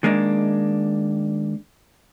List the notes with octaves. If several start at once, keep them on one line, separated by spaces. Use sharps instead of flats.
D#3 G#3 A#3 D4